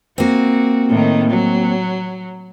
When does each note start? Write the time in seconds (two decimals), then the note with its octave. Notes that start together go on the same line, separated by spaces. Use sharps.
0.18 A#3 C4 F#4
0.89 A2 D#3
1.30 F#3